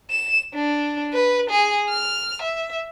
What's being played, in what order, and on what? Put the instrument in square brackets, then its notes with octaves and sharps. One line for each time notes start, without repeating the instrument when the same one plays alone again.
[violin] E7
D4
B4
G#4
F6
E5